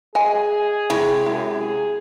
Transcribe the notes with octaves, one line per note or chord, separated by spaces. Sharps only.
G#4 D#5 G#5
C3 G#3 E4 C#5
F#2 E4
G#4